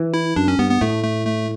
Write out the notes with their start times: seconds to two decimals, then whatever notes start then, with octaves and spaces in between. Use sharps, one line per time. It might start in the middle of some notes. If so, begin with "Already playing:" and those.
Already playing: E3
0.14 E4
0.36 F#2 D4
0.48 C#4
0.59 G2 B3
0.71 B3
0.81 A2 A3
1.04 A3
1.27 A3